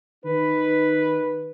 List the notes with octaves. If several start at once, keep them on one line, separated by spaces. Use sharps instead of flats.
D#3 D#4 B4